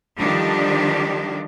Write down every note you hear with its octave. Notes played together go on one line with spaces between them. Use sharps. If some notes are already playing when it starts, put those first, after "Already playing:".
D3 D#3 F3 G3 D4 G4